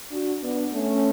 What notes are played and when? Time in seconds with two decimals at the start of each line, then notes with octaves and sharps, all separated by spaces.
0.12 D4 F#4
0.43 B3 D4
0.74 A3 C#4